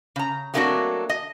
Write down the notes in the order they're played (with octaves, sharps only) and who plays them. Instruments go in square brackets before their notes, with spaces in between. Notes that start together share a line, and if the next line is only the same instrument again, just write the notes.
[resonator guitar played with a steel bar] C#3 A#5
F#3 A3 A#3 C4 D4 F#4
D#5